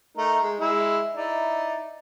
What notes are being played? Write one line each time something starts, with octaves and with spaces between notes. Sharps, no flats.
A3 D#4 A#4
G#3
G#3 E4 E6
D#4 E4 D5